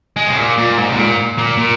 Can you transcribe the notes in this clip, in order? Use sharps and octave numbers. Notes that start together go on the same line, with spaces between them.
G#3
C3
A#2
A#2
G#2
C3
A#2
A#2
A#2